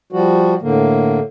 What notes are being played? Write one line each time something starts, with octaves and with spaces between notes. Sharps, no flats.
F3 G3 F#4
A2 D3 A#3